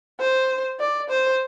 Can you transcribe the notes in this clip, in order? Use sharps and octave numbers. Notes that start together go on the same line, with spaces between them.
C5
D5
C5